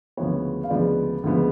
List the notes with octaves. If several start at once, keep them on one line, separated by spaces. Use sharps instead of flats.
D2 C#3 F3 G#3 B3 C#5
F5
D2 C#3 F3 G#3 B3 D5
D2 C#3 F3 G#3 B3